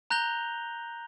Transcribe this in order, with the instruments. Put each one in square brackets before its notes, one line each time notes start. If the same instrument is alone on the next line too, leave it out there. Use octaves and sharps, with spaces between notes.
[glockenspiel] A#5 F#6 G6 A#6 F7 G7